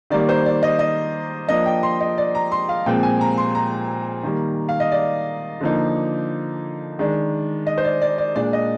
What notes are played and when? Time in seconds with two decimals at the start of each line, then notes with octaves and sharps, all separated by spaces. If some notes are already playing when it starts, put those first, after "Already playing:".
0.10 D#3 G3 A#3 D5
0.29 C5
0.46 D5
0.63 D#5
0.79 D#5
1.48 F3 A#3 D4 D#5
1.66 G5
1.83 C6
2.01 D#5
2.18 D5
2.35 A#5
2.52 C6
2.69 F5
2.86 A#2 F3 G#3 C4 G5
3.03 G#5
3.21 A#5
3.38 C6
3.55 A#5
4.23 D#3 G3 A#3
4.69 F5
4.80 D#5
4.92 D5
5.61 D3 F3 A#3 D#4
6.99 D#3 G#3 D4
7.67 D#5
7.78 C5
7.84 D5
8.02 D5
8.18 D5
8.35 A#2 G#3 D4 D5
8.53 D#5